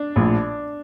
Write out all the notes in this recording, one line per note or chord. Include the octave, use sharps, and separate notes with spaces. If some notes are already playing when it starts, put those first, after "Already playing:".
Already playing: D4
A#1 A2 F3